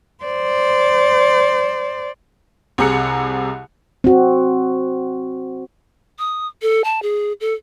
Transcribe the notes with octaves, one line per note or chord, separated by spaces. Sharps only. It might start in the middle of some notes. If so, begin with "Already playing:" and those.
C5 D5
C2 C3 G#4 A#5 F#6 C#7
C4 F#4
D#6
A4
A5
G#4
A4